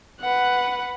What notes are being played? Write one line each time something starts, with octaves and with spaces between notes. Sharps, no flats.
B4 F#5